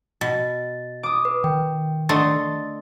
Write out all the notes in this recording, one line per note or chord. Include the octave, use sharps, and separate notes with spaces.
B2 A6
D6 D#6
B4
D#3 G5
D3 A3 D#5 C6 A6